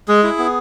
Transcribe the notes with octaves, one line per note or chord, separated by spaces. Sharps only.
G#3 G#4
E4
B3